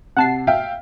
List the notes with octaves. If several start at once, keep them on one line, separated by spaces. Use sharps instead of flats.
C3 F#5 A5 C7
E5 F5 G5